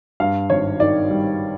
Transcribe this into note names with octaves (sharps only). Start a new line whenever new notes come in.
G2 F5
G#1 C#5
D#3 D5
G3